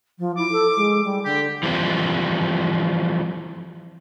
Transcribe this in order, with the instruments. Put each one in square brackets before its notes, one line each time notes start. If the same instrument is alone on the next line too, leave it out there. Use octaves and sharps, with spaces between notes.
[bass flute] F3
[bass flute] E4 [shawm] D6
[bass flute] A4
G#3
G3
[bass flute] D3 [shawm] G4
[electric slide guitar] E3 F3 G3 C4